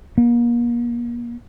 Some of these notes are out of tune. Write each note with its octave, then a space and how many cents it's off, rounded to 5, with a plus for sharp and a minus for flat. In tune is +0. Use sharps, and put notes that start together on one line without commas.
A#3 +35